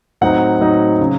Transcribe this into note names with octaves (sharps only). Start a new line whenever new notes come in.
A2 F#3 C4 D#4 F#5
A2 F#3 C4 D#4
C#3 F#3